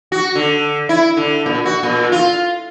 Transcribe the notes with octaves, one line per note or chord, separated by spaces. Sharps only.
F#4
D3
E4
D3
A#2
F#4
A#2
F4